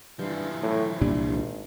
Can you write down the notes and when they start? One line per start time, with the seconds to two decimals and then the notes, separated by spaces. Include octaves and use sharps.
0.19 G2 E3 F3
0.63 A2
1.01 C2 A#2 G3 D4
1.31 G#1